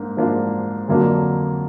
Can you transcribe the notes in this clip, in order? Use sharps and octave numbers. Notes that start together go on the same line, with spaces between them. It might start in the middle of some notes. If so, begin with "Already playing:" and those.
Already playing: G#2 A#3 D4
G#2 F3 A#3 D4 F4
F2 D3 F#3 A#3 D4